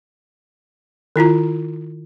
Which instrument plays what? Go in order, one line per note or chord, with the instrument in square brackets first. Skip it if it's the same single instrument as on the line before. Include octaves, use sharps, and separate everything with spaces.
[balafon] D#3 E4 F4 A#5